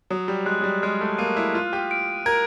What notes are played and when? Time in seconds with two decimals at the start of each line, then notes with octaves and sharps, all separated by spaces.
0.10 F#3 D#6
0.28 G3
0.46 G#3 F#6
0.61 F#3
0.64 G3
0.82 G#3 F6
1.01 A3
1.18 A#3 D#7
1.36 E4
1.54 F4 F#6
1.73 G4
1.91 D7
2.26 A#4 G#6